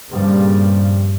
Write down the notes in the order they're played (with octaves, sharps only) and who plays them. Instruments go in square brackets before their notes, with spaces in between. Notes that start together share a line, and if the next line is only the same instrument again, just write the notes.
[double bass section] G2 A#2 C#3 F3 G3